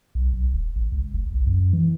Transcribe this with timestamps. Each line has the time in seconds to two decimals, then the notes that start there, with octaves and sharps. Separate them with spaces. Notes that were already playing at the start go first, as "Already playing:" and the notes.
0.15 B1
0.33 B1
0.53 D#1
0.76 A1
0.92 C#2
1.14 F#1
1.32 C2
1.47 F#2
1.73 E3